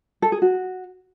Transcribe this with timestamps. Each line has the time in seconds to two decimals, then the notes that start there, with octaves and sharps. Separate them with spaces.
0.22 A4
0.32 G#4
0.42 F#4